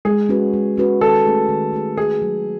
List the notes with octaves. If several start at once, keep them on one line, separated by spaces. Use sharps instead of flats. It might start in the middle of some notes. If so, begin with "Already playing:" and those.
G#3 G#4
C#4 F#4 B4
G#3
C#4 F#4 B4
D#3 A4
A3 C#4 G#4
D#3
A3 C#4 G#4
D#3 G#4
F#3 A3